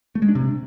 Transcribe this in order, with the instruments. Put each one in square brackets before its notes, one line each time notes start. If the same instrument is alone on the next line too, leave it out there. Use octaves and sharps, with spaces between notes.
[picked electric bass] A3
G#3
D4
C3